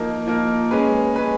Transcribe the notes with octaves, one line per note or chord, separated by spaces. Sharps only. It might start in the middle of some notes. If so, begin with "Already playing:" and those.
Already playing: F3 A#3 D#4 A#4
F3 A#3 D#4 A#4
G#3 C#4 G#4 B4
G#3 C#4 G#4 B4